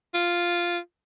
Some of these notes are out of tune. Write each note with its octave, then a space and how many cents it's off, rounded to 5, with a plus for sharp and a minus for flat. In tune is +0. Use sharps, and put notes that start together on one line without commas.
F4 -5